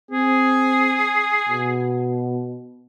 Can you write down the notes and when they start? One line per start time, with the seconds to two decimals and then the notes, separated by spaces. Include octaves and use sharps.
0.11 C4 G#4
1.49 B2